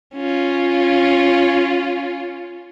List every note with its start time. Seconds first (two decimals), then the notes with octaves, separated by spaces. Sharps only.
0.15 C#4 F4